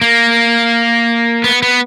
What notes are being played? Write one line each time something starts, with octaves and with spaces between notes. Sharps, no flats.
A#3
B3
B3